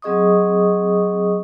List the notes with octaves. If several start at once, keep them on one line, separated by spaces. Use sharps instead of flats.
F#3 C4 G#4 D#5 C#6 D#6